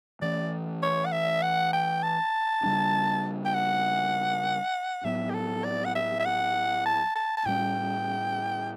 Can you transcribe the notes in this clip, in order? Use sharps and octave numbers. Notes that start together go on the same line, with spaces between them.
E3 A3 C#4 D5
C#5
F#5
E5
F#5
G5
A5
C#3 G3 D4
G5
F#5
A2 F#3 B3 E5
G4
A4
D5
F#5
E5
E5
F#5
A5
A5
A5
A2 G3 C#4 G5